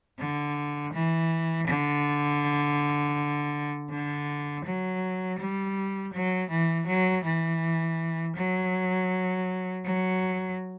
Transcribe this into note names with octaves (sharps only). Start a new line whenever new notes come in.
D3
E3
D3
D3
F#3
G3
F#3
E3
F#3
E3
F#3
F#3